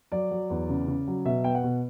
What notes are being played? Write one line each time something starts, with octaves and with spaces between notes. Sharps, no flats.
F#3 D5
F#3
E2
C#3
C#3
F#3
B2 E5
B3 G5
F#5
B2